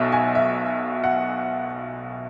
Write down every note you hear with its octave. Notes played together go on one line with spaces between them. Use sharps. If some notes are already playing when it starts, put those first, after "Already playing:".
Already playing: B1 B2 E5
G#5
E5
F#5